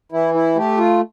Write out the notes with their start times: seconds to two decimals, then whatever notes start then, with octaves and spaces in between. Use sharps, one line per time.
0.12 E3 E4
0.34 E4
0.55 A3 G4
0.78 F4